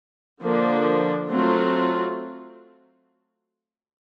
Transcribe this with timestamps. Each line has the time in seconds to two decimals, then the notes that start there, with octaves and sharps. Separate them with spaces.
0.40 D3 F3 A#3 D4
1.29 F#3 A3 C4 F4